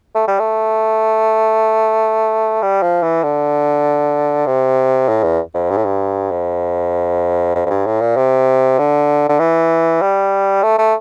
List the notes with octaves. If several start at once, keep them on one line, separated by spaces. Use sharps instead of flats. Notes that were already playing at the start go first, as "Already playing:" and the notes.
A3
G3
A3
G3
F3
E3
D3
C3
A2
E2
F2
G2
A2
G2
F2
F2
F2
G2
A2
A#2
C3
D3
D3
E3
G3
A3
A3